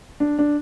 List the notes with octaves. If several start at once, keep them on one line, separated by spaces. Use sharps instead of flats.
D4
D4